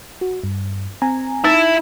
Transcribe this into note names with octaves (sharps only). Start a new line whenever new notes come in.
F#4
G2
C4 G#5 A#5
D#4 E4